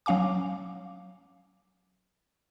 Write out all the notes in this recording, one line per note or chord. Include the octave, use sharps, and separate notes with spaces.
F#3 C#4 F5 G#5 D6